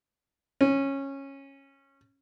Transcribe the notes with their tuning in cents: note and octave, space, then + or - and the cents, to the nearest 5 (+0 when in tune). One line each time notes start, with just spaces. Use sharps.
C#4 -15